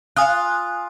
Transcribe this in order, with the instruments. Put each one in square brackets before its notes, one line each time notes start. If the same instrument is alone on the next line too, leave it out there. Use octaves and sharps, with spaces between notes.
[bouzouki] F4 [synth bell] G#5 D#6 F#6